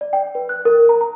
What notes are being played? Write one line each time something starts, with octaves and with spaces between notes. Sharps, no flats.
D5
G5
B4
F#6
A#4
A#5
A#5